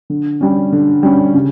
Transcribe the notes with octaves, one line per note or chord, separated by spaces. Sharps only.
D3
G3 C#4
D3
G3 C#4
C#3